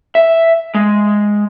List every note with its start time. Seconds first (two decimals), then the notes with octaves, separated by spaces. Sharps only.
0.15 E5
0.74 G#3